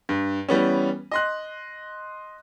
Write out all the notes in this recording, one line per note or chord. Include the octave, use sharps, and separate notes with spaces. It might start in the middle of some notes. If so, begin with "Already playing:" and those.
G2
E3 G3 B3 C#4
D#5 C6 F#6